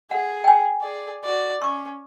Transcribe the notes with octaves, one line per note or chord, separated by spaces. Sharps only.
G#4 F#5
G5 G#5
G#4 D5
F#4 D5
C#4 C#6 D6